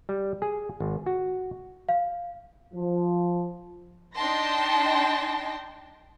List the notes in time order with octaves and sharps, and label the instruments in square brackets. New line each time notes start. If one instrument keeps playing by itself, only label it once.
[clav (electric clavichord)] G3
G#4
G#1
F#4
[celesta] F5
[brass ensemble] F3
[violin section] D4 D#4 G5 A5 C6 A#6